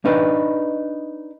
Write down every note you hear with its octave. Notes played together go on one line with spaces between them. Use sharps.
D4 D#4 B4